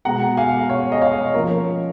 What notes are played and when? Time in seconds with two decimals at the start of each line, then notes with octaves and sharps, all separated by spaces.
0.05 B2 G#3 B3 F#5 A#5
0.37 F5 G#5
0.69 C#5 F5
0.92 D#5
1.02 C#5 F5
1.34 F3 A#3 C#4 A#4 C#5